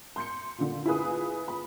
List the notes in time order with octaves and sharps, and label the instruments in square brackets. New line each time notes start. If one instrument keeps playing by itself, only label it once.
[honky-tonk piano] C6 G6 C#7
A#2 D3
E4 F4 G#4 B4 D#6
B5